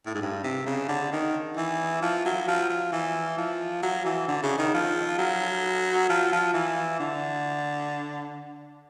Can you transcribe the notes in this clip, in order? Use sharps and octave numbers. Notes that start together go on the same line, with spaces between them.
A2
G#2
G2
C3
C#3
D3
D#3
E3
F3
F#3
F3
F3
E3
F3
F#3
E3
D3
C#3
D#3
F3
F#3
F3
F3
E3
D3